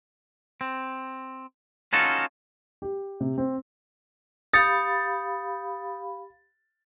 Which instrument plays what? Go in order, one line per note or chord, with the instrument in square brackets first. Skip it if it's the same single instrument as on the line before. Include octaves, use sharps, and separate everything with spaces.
[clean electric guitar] C4
C#4 D#4 F4 F#4 A4
[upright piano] G4
C3
C4
[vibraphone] G4 F5 B5 [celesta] D#6 G6 C#7 [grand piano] A6